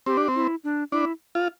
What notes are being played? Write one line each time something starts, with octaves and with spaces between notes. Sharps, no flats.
C4 G4
D4
C4
E4
D4
D4 E4
F4